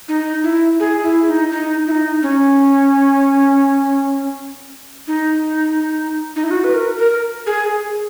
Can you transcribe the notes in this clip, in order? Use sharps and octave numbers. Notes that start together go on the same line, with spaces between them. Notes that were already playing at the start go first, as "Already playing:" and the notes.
D#4
E4
G#4
E4
D#4
D#4
E4
D#4
C#4
D#4
D#4
E4
F#4
B4
A#4
A#4
G#4